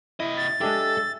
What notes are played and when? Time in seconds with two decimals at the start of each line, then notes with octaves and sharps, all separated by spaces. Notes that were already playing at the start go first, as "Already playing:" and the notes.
0.20 C3 E4 D#5
0.37 A6
0.61 G#3 D4 G4 A4 E5